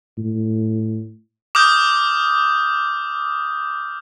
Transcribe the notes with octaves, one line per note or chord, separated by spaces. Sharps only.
A2
D6 D#6 F6 G6